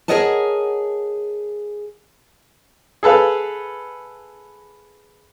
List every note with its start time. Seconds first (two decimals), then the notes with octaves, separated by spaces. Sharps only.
0.08 G#4 A#4 C#5 D#5 F#5 A5
3.03 G#4 A4 B4 F5